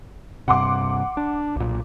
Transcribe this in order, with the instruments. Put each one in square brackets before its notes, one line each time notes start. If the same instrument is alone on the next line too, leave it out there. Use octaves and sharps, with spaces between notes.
[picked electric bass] G2 C3 [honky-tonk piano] F#5 C6 D6
[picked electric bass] D4
B1 A#2